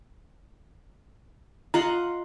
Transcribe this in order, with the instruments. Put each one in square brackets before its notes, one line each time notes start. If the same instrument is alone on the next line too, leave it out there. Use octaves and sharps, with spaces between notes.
[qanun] F4 D#5 F#5 [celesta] A#5